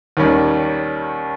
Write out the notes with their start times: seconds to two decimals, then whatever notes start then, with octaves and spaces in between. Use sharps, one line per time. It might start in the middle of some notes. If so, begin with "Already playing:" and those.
0.17 D#2 D#3 G3 C#4